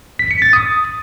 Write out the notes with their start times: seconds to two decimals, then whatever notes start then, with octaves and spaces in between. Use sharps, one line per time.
0.19 B6
0.31 C#7
0.42 A6
0.53 D#6